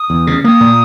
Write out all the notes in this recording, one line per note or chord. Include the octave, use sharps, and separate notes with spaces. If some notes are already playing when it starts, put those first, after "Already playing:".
Already playing: D#6
E2
C#3
A#3 D#6
A#2